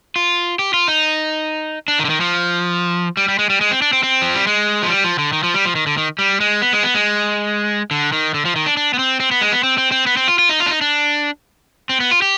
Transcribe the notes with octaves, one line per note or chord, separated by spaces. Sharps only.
F4
G4
F4
D#4
D4
D#3
D3
D#3
F3
G3
G3
G#3
G3
G#3
C4
D4
C4
C4
F3
G3
G#3
F3
G3
F3
D3
D#3
F3
G3
F3
D#3
D3
D#3
G3
G#3
B3
G#3
B3
G#3
D3
D#3
D3
F3
D#3
D4
D4
B3
C4
C4
B3
G#3
B3
C4
C4
C4
B3
C4
F4
F4
D#4
F4
D4
D#4
D4
C4
B3
F4
G4